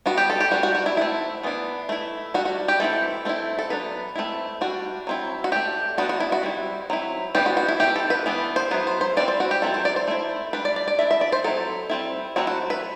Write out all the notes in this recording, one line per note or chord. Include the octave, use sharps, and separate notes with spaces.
G3 B3 D4 F#4
G4
A4
G4
G3 D4 F#4
F#4
F#4
E4
A3 C4 E4
E3 B3 D4
A3 E4
G3 D4 F#4
F#4
G4
E3 A3 C4 E4 A4
A3 C4 E4
A4
F#3 B3 D4 B4
A3 C4 E4
G3 D4 F#4
F#3 C4 E4
F#4
A3 D4 G4
G3 B3 D4 F#4
F#4
E4
F#4
G3 C4 E4
F#3 C4 E4
E3 B3 D4 G4
F#4
F#4
E4
E3 A3 C4 G4
A4
B4
E3 B3 D4
C5
F#3 B3 E4 B4
C5
C5
E3 G3 C4 D5
C5
F#4
G4
F#3 C4 E4 A4
C5
D5
C5
A3 E4
G3 D4 B4
D5
D5
D5
A3 E4 E5
E5
D5
C5
F#3 C4 E4 A4
G3 C4 E4
F#3 A3 C4 E4 F#4
F#4
B4